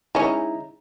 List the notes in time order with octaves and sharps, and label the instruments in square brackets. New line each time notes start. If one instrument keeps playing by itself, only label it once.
[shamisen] G#3 C#4 [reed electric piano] D#4 E4 A#5